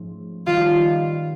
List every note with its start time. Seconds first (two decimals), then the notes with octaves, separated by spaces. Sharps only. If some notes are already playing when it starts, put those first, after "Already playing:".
Already playing: G#2 F3 A3 C#4
0.46 D#3 G3 B3 F4